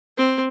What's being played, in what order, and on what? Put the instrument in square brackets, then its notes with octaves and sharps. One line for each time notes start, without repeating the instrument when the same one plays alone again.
[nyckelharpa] C4